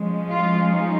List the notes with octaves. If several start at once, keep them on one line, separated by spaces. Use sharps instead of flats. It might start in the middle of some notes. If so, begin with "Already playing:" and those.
Already playing: F3 G#3 C#4
F4
D#4